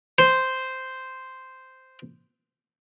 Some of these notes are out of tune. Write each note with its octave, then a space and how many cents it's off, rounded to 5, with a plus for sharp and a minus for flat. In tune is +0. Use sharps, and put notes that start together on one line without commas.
C5 -5